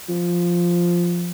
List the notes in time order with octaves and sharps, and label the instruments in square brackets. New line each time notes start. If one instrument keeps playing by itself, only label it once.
[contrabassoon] F3